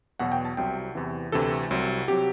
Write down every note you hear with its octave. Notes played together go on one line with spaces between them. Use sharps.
E2 B2 F#3 F#5
G5
A5
C2 C3 F#3 G5
E2 C3 E3
D2 C3 E3 A4
C2 C3 F#3
C3 F#3 G4